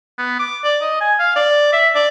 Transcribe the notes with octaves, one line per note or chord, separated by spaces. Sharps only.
B3
D6
D5
D#5
G#5
F5
D5
E5
D5